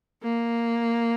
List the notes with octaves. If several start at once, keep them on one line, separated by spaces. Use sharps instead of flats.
A#3